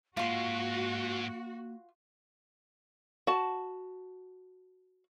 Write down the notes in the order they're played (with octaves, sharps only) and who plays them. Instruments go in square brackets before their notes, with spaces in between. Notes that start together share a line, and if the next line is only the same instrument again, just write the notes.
[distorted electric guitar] G#2 G#3 [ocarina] A#3 [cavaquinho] F4 C6 [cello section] F#4
[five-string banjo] F#4 A5